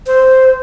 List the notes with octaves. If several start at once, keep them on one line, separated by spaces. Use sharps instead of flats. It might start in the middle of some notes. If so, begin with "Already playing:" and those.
C5